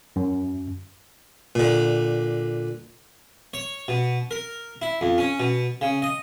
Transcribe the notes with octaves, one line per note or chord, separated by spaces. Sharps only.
F#2
A#2 D3
C#5
B2
A#4
E4
F2
C#4
B2
C#3
D#5